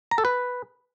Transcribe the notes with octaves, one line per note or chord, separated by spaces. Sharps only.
A#5
A4
B4